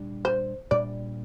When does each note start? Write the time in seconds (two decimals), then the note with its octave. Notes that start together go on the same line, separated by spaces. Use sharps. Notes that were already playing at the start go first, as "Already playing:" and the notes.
Already playing: A#2 G3 D4
0.25 C5
0.71 A#2 G3 D4 D5